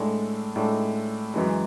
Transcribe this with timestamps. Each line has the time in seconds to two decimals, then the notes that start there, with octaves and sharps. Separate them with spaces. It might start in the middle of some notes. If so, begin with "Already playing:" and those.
Already playing: A2 G#3 D4 A4
0.56 A2 G#3 D4 A4
1.34 F#2 E3 G#3